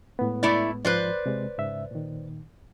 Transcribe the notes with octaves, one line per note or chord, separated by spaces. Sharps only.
A2 G#3 B3
A3 E4 D5
G#2 F3 B4 C5 D5
C3 G#3
G#2 C#3 E5
A#2 D#3